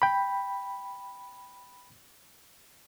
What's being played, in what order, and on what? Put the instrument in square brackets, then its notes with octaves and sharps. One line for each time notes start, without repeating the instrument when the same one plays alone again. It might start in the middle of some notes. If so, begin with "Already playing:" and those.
[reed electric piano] G5 B5